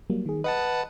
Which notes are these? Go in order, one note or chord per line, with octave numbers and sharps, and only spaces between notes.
F#3 G3 A#3
D#3 G#4
B4 D#5 F#5 A5